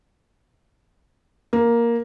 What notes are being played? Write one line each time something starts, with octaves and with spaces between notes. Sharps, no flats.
A#3